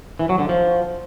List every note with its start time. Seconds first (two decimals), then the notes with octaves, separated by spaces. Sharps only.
0.19 E3
0.29 F#3
0.39 D3
0.49 F3